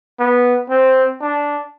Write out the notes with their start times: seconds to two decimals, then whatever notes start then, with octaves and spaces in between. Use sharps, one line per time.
0.19 B3
0.70 C4
1.21 D4